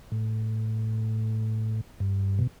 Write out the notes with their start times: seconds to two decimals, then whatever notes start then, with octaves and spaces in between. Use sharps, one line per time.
0.12 A2
2.00 G2
2.39 B2